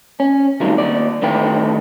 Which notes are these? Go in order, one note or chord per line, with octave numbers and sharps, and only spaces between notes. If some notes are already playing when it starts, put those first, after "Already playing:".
C#4
G2 C3 D#3 F#3 A3
D#2 D5
A2 D3 D#3 B4 G5